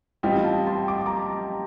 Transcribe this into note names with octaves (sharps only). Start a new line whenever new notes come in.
A1 A2 G3 C4 F4 D#5 G5
F5 A5
A5 C6
D6
A#5 D6